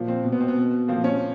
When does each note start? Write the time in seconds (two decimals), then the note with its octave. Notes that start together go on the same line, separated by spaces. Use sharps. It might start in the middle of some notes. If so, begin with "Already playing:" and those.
Already playing: A#2 F3
0.08 C4
0.23 B2
0.32 B3
0.40 C4
0.48 B3
0.56 B2
0.88 A#2 F3 C4
1.04 C#4